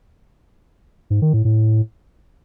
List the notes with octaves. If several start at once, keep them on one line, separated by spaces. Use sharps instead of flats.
G#2
D#3
A2
A2